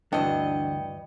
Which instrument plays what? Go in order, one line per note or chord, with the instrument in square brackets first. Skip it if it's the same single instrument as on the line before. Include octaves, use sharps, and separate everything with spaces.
[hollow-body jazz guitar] D2 E3 D4 [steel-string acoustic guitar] G2 D#5 [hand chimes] G5